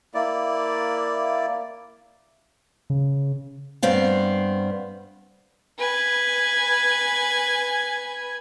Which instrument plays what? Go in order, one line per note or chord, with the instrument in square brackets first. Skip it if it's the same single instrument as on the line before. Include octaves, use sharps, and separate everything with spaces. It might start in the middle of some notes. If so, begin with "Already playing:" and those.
[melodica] A#3 E4 D5
[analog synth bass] C#3
[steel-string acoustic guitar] G2 B3 C4 F5
[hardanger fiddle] B4 G#5